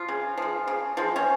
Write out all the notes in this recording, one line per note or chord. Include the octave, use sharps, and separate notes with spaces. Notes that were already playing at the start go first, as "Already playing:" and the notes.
Already playing: F3 F4
C#3
F3 G#3
C#3
F3 G#3
C#4